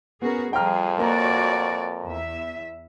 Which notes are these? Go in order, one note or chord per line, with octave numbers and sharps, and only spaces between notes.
B3 C#4 F#4 G#4 A#4
F2 F3 G3 G#4 G5 A#5 F6
A#3 F#4 C#5 D5 A#5
E2 E5